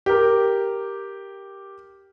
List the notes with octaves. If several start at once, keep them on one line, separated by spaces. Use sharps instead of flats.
G4 A#4